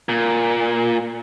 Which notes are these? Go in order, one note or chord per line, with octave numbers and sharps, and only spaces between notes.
A#2